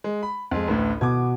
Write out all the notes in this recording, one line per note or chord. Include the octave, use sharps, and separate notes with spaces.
G#3
B5
F2 G#3
A1 D2 A2 B4
B2 D6 G#6